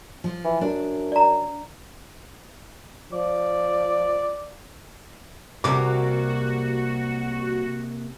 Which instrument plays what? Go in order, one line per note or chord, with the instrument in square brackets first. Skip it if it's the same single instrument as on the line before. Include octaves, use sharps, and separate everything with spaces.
[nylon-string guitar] F3
[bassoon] E3
[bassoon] F#2 [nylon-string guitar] D4
[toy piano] D5 A#5
[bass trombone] F3 [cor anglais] D5
[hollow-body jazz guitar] C2 [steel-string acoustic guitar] C3 A#3 [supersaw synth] F#4 [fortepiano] D6